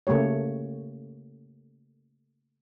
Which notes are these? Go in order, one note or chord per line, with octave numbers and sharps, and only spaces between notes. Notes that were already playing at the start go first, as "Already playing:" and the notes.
C#3 A3 A#3 G4 C#5